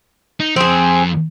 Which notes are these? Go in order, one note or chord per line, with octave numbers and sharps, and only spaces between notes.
D#4
F2 C4 G#4